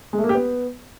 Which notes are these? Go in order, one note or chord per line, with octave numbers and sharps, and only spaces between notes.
G#3
A3
A#3
G4
B3